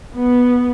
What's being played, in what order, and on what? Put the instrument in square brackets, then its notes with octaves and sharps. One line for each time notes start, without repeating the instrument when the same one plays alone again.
[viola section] B3